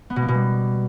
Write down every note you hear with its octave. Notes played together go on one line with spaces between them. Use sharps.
B3
B2
A#3
B2
G3